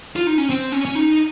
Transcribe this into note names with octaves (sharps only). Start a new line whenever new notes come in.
F4
D#4
C#4
C4
C#4
C#4
D#4